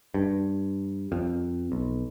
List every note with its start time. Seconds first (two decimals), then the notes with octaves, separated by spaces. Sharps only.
0.14 G2
1.12 F2
1.72 B1